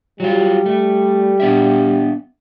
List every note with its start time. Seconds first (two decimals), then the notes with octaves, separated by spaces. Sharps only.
0.20 F#3 G3 F4
0.66 A3
1.40 B3 D4 E5